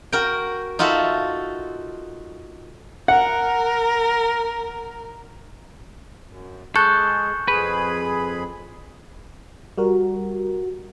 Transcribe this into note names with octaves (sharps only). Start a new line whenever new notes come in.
F#4 A#4 G5
D#4 F4 F#4 A4 E5
A#4 F#5
F#2
G#3 G#4 A4 C#6 F#6 G6
F2 G#4 B4 B5
G3 F#4 A#4